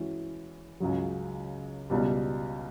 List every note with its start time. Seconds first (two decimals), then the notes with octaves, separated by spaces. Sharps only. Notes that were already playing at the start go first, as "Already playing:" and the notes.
Already playing: E3 G#3 C#4 F#4
0.80 C#2 C#3 F#3
1.90 C#2 B2 G3